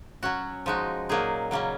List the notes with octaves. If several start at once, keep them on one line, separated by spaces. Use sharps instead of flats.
F#3 C#4 F#4
F3 G#3 D#4 F#4
A#2 F#3 A#3 D#4 G#4
C#3 F#3 A#3 C#4